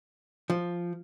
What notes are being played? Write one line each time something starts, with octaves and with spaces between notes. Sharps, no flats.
F3